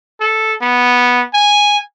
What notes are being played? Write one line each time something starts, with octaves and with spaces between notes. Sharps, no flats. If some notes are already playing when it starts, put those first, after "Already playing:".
A4
B3
G#5